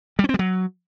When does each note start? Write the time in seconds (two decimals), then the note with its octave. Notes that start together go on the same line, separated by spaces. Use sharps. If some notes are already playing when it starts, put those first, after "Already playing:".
0.19 G3
0.24 C#4
0.29 C4
0.34 G3
0.39 F#3